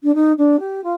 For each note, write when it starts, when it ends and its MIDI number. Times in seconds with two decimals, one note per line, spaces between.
0.03 0.14 62
0.14 0.32 63
0.38 0.59 62
0.59 0.83 67
0.83 0.93 65